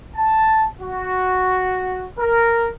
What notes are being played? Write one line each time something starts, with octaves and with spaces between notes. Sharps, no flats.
A5
F#4
A#4